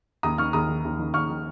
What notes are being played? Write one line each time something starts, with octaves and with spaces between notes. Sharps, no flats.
D#2 A#5 D#6
D#3 C#6 F6
D#2 A#5 D#6
D#3
D#2
D#3
D#2 C#6 F6
D#3